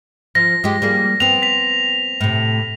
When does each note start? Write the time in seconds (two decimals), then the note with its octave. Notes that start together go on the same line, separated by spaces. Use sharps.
0.35 F3 A#6
0.64 G#3 G4
0.82 G3 A#3 G#4
1.20 B3 C4 F7
1.42 B6 F7
2.21 A2 C3